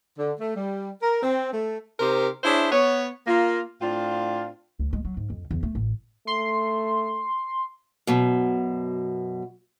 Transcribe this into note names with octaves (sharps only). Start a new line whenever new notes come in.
D3
A3
G3
A#4
C4
A3
C3 D#4 G4 A#4 C5
D4 E4 G#4 C5 C#5 E5
B3 C#5
A#3 F4
A2 C4 D4 F4
D2
G#3
F#3
G#2
F2
E2
A3
A1
A3 C6
F#2 B2